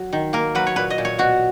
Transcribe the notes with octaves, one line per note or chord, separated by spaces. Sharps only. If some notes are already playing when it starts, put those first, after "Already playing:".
Already playing: F#3 F#4
D#3
A#3 A#4
F#3 B4
C#5
A#2 B4
D#5
A#2
C#5
B2 F#4